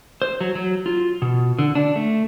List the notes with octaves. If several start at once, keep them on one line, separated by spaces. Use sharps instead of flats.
C5
F#3
F#3
F4
B2
D3
D4
A3